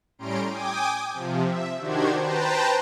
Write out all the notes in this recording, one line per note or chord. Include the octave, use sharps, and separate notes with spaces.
A2 G3 C#4 A#5 C6 D7
G5 G#5 D6 D#6
C3 F3
E5
D#3 D4 F#4 G4 C5 G#6
B4 C5 G5 A5 A#5